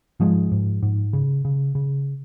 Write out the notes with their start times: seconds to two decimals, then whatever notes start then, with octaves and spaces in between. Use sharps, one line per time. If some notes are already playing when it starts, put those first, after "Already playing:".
0.20 G#2 F3 G#3
0.52 G#2
0.82 G#2
1.13 C#3
1.45 C#3
1.75 C#3